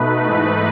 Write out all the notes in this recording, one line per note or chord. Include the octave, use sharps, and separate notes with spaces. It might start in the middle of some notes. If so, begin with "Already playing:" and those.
Already playing: B2 A3 D#4 B4
G#2 E3 A3 D#4